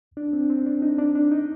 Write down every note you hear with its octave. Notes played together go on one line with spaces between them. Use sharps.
D4
C4
C4
D4
D#4
D4
D4
D#4